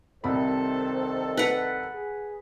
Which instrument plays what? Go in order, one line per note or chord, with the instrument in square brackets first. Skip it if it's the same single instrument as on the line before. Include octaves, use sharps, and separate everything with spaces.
[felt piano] C2 C3 B5 [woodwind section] D#3 A4 [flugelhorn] C5
[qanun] B4 F#5
[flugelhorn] G#4